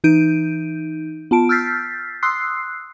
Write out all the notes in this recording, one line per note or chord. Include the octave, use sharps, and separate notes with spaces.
E3 D#4 G6 D7 D#7
B3 F4 A5 D7
E6 F6 G6 A6 B6 C7
C6 D#6 E6 F#6 C7